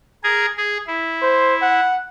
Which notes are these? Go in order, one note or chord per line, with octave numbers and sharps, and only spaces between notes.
G#4 A#4 G#5
G#4
E4
C5
F#5